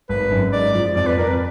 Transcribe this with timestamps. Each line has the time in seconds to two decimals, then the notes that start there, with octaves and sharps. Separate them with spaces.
0.09 G#1 B4
0.31 F#2
0.53 G#2 D5
0.75 F3
0.96 F2 D5
1.06 B4
1.17 F2 A#4
1.28 B4